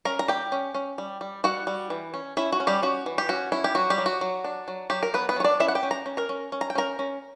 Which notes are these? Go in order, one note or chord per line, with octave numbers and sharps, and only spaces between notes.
C#4 A#4 A#5
A#5
G3 G4 G5
C#4
C#4
G3
G3
G3 F#4 F#5
G3
E3
C#4
C#4 E4 E5
F#4
C#4
G3 G4
C#4 F#4
E3
G4
C#4 F#4
C#4 E4
G4
F#3 F#4
G3 G4
F#3
F#4
F#3
D4
F#3
F#3 G4
A#4
F#3 B3 B4
B3 B4
F#3 C#5
D4 D5
C#4 E4 E5
F#5
G4 G5
C#4
A#5
C#4
A#4 A#5
C#4
C#4
A#5
G5
C#4 A#4 A#5
C#4